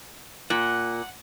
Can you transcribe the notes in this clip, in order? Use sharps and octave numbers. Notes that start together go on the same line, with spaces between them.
A#2 F#5